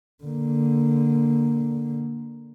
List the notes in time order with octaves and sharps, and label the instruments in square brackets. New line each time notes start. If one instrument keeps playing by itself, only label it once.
[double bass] D3 A#3